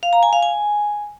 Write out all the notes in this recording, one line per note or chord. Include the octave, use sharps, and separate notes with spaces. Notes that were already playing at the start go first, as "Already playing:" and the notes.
F5
A#5
G#5
F5
G#5